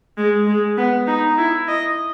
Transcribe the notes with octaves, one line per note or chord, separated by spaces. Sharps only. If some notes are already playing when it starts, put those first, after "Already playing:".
G#3
G#3
B3
D#4
E4
D#5